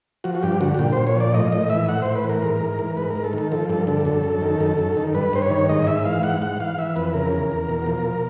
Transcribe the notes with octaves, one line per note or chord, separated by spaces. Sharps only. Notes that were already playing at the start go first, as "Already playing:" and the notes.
F3 F#4
F#4
G2 G4
D3 F#4
F#4
A#2 G4
A#2 C5
C#5
F3 D5
A2 D#5
A2 D#5
E3 E5
A2 F#5
A2 C5
B4
E3
A#4
G#2
G#2
E3
G#2 B4
G#2 A#4
A4
D#3
A4
F3 A4
G2 A4
D3 A4
F#2 A4
F#2
D#3
F#2
F#2
D#3
G2 B4
G2 C5
C#5
D#3
G#2 D#5
G#2 E5
E3 F5
G#2 F#5
G#2 F#5
E3 F5
E3 E5
F2 B4
C#3 A#4
E2
E2
B2
F3